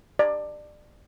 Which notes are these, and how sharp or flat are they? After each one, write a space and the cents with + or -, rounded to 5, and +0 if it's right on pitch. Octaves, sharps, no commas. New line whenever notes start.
D5 +25